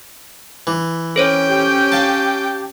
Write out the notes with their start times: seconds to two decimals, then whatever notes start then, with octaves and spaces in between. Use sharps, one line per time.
0.67 E3
1.16 C#4 A4 C5 C#5 G5
1.48 G4
1.92 F5 A5